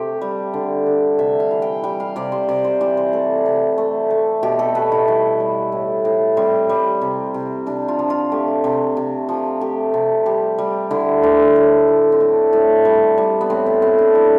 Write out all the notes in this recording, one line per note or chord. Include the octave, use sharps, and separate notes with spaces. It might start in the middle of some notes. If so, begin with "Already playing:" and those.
Already playing: C3 A3 F4 G4
G3
D3
D3
C3 E5
F5
E3
G5
G3 G5
F5
C3 D5
C5
C3 D5
C5
E3 D5
C5
A3 A4
C3
A3
A3
B2 G4
A4
B2 B4
E4
G3 E4
G3
A2
A2
G3 C4
G3
C3
C3
C3 D4
F4
F3
F4
A3 G4
C3
C3
F3
A3 G4
C3
G3 G4
G3
D3 E4
D3
A2
F3
C4
A3 D4
A2
G3
G3
B3
A2 C4
B3
A2 C4
D4
G3 E4